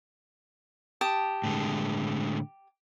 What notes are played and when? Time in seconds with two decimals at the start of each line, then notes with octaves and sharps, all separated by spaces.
1.01 G4 A5 D#6
1.44 A2 D3 G#3